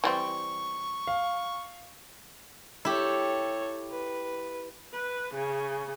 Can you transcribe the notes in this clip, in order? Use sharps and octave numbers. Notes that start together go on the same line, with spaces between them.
E3 G3 C4 C#6
F5
E4 G4 A4 C#5
B4
B4
C#3